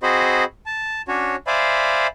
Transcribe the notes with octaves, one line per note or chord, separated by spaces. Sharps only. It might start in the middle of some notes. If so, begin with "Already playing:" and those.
C4 F#4 G#4 C5 D#5 B5
A5
C#4 D4 F#4 C#5
C5 D5 E5 F5 G#5 B5